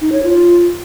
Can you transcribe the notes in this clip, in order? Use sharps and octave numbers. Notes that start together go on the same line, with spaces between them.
D#4
C#5
F4